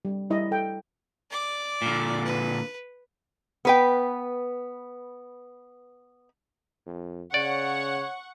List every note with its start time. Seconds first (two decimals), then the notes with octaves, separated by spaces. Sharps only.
0.05 G3
0.30 G3 E4 D#5
0.51 A4 G5
1.30 D5 D6
1.82 A#2 D3
2.24 B4
3.65 B3 B4 G5
6.86 F2
7.34 C#3 C#5 D5 F#5 C#6